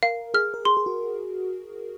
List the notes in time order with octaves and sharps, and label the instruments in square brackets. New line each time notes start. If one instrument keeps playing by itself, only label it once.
[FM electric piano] A#4 [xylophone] F5
[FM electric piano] G#4 [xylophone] F6
[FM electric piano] A#4
[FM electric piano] G#4 [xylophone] C6
[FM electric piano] G#4
F#4